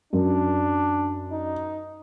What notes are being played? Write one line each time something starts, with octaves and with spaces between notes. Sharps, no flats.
F#2 D4
D#4